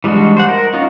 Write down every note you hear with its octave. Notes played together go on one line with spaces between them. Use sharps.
E3 G3 G#3 D4 F#4
C5 F#5
A#4
C#4 D#4 F4 F#4